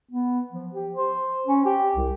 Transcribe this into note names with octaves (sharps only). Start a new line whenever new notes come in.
B3
F3
G4
C5
C#4
G4
C2